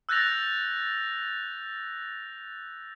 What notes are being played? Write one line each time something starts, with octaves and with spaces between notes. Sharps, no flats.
E6 F#6 G6 A6 A#6 F7